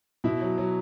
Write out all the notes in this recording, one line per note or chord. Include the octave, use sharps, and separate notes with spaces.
B2 E4
F#3
F#3